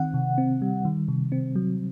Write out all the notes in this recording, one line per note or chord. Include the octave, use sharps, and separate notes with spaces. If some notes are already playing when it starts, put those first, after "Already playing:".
Already playing: D#3 C4 F#5
C3
C4
G3
D#3
C3
C4
F#3